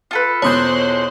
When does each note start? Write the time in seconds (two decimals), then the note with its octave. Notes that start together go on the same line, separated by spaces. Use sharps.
0.11 F4 A4 B4
0.42 E2 B2 C5 C#5 C6 D#6 F#6 G6